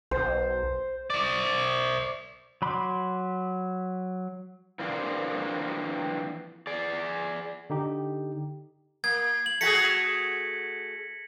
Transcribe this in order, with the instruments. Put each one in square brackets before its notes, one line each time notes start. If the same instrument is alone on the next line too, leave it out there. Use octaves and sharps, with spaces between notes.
[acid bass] B1 [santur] C5
[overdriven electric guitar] C5 D5
[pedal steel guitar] F#3 B5 C6 D6
[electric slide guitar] E3 F3 A#3 C4 D4
G#4 D5
[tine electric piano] D3 D#4 G4
[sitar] A#3 [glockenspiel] G#6
[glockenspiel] F#7
[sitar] A3 F#4 G#4 [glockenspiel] A#6 B6 C#7